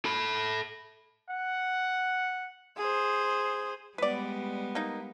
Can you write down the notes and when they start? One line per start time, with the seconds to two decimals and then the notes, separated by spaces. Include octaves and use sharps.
0.05 A4 B5
1.29 F#5
2.77 G#4 C5
3.98 G3 G#3 B3 B4 D5
4.75 A#3 D#4